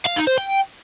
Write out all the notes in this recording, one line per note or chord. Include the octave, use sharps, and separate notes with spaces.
F5
D#4
C5
G5